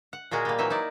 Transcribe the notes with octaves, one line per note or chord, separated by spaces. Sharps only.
F#5
A#2 G#3 F#4 G#4 A#4
G3 A#3
E3 F#3 D#4 E5 G#5
D#4 E4 D5